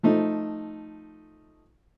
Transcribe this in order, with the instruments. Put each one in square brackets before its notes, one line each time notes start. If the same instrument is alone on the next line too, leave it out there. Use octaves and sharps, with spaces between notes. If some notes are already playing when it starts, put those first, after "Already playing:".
[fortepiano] F3 A3 D#4